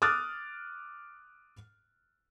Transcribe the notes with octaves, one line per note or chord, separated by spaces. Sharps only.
D6 D#6 F6 F#6 A6